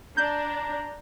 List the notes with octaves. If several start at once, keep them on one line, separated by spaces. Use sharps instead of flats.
D4 A#5 G6